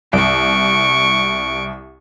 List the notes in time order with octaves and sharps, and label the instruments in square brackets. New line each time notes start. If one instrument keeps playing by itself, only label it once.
[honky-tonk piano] C2 [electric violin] C#6 D7